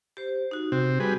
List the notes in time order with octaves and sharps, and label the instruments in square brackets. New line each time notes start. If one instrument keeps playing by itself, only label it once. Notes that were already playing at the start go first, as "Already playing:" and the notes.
[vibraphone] G4 C5
D#4 F#4
[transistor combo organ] C3 C4 [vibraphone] F#4
[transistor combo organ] G3 G#4 B4